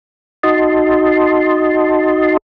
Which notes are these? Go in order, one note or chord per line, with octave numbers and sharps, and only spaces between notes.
D#4 F#4 D#5 A5 C6